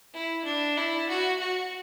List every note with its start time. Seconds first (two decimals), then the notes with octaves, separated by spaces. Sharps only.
0.14 E4
0.45 D4
0.78 E4
1.09 F#4
1.40 F#4